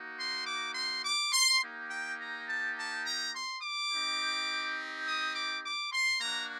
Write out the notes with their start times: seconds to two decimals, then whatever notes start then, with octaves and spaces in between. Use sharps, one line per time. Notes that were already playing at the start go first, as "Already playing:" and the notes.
Already playing: A#3 D#4 F#4
0.17 C6
0.47 D6
0.75 C6
1.04 D6
1.32 C6
1.61 A#3 D#4 G4
1.90 G5
2.19 A#5
2.48 A5
2.77 A5
3.05 A#5
3.34 C6
3.62 D6
3.91 C4 D#4 G4
5.06 D#6
5.35 D6
5.64 D6
5.92 C6
6.21 A#3 D4 F#4 A#5